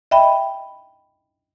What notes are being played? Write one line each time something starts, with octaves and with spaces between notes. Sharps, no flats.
D#5 E5 G5 B5